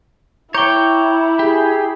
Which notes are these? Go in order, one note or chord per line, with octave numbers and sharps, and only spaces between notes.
E4 C#5 G5 A#5 D6 G6
G4 G#4